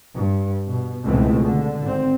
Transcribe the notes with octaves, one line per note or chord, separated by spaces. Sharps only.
G2
B2
C#2 B2 E3 G#3 A3 C4
D3
G#1 C4